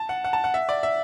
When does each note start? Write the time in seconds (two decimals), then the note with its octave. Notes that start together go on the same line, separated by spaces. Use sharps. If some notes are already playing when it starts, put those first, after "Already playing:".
Already playing: A5
0.09 F#5
0.24 F#5
0.33 A5
0.44 F#5
0.54 E5
0.69 D5
0.83 E5